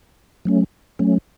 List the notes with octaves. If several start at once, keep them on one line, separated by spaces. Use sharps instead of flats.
F#3 A3 C#4
F#3 A3 C#4